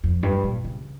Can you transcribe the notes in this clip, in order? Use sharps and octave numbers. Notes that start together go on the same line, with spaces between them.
F2
G2
A#2
C#3